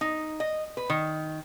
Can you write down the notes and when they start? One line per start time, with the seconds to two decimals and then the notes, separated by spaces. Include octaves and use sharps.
0.01 D#4
0.40 D#5
0.77 B4
0.90 D#3